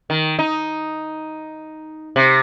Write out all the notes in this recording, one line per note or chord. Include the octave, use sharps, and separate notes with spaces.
D#3
D#4
C3